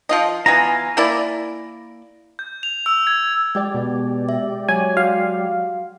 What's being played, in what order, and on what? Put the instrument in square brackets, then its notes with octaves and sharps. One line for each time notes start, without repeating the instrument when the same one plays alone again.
[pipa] F3 F4 D#5
[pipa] E3 B3 F4 [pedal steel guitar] G#5 A#5
[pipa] A#3 E4 D5
[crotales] G6
F7
E6
G#6
[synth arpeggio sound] G#3 G4 D5 [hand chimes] G#6
[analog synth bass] B2
[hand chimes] E5
[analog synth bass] F#3 [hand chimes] C#5 [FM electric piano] G#5
[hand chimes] F#4 [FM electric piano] F5